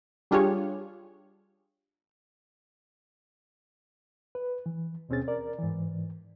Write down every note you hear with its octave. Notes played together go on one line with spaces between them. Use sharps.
G3 D4 F4 G4 G#4 C#5
B4
E3
D#2 B2 C4 C#4 G#4 A6
A#4 D5
G#2 E3